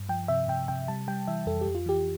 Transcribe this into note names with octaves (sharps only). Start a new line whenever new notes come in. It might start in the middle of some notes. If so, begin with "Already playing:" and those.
Already playing: G2
F3 G5
C3 E5
C3 G5
C3 G5
G3 A5
G3 G5
E3 E5
F2 A4
G4
F2
F4
E3 G4